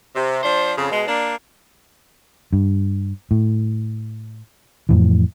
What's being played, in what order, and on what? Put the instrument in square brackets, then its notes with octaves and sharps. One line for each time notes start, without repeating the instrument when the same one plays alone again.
[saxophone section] C3
F3 D4 C5
F2 C#3
B2 G#3
A#3 D4
[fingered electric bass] G2
A2
F2 A2 E3